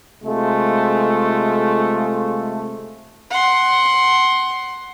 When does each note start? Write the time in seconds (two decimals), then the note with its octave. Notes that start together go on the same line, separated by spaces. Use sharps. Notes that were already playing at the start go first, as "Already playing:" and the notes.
0.24 C3 G#3 A3 F4
3.30 F#5 C6